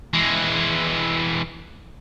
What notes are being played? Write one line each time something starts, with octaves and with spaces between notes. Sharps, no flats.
E3 G#3